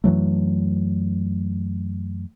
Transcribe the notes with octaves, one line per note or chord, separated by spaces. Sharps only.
F#2 E3 F#3 A3